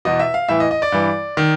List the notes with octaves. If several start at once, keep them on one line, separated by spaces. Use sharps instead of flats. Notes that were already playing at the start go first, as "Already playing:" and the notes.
E2 B2 D#5
E5
F5
A2 E3 E5
D#5
D#5
D5
G2 E3
D#3